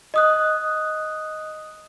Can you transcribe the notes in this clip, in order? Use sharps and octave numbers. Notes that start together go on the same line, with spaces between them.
D#5 D#6 F#6